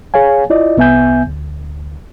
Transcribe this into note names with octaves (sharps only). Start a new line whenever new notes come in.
G#4 C#5 F5 G#5
E4 F4 D5 D#5
C2 B3 E5 G#5 G6
D2